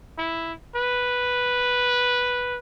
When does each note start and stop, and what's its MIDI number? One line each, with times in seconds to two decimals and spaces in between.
0.18 0.53 64
0.76 2.58 71